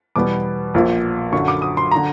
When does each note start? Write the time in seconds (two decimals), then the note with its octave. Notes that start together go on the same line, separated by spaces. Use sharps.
0.16 E2 B2 G3 B3 D6
0.74 A#1 A#2 F3
1.32 F#2 D3 F#3 C#6
1.48 D6
1.62 D#6
1.77 C6
1.91 D3 A#5